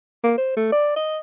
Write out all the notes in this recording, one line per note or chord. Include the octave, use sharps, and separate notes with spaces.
A#3
C5
A3
D5
D#5